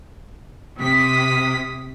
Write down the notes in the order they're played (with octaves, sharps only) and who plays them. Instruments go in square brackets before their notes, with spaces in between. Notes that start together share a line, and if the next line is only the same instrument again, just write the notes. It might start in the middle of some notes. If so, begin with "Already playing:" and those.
[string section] C3 B6 [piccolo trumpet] D#6